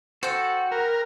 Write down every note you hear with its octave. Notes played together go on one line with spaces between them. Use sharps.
F#4 A4 C5 G5
A#4 B4